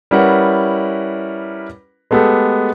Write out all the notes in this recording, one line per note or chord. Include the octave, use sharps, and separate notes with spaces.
G3 C#4 E4 A#4 B4 F#5
G#3 A3 B3 G4 A4